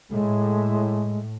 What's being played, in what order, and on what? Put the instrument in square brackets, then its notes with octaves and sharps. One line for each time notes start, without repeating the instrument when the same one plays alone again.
[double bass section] A2 [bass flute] G#3